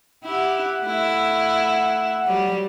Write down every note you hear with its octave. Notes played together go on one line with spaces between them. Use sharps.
E4 G4 F#5
A3 E4
F#3 G3